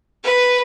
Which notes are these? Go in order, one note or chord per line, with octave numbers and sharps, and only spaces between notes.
B4